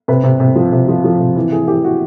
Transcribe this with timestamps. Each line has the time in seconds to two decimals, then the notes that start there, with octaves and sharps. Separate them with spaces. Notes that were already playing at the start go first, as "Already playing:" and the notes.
0.08 C3 B4
0.24 C3
0.40 C3
0.56 F3
0.72 C3
0.88 F3
1.04 F3
1.19 C3
1.36 E3
1.52 A2 G#4
1.67 E3 G4
1.83 E3 F#4